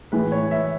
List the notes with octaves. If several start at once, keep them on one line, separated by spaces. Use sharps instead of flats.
A2 E3 G#3 B4
C#5
E5